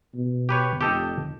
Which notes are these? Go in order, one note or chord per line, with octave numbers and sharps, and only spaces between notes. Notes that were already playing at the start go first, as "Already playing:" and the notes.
B2
G4 B4 C#5
F1 G4 A4 D#5